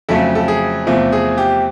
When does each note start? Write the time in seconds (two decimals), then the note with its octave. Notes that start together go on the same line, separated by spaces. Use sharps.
0.09 F2 C#3 F#3 A3 A4
0.35 A4
0.48 G#4
0.86 E2 C3 F3 A3
1.12 G#4
1.38 G4